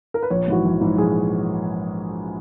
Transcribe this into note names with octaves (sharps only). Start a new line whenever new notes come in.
A#4
B4
A#1 C#5
G#2 E3 F#4
A#1
G#2 E3
A#1 G#4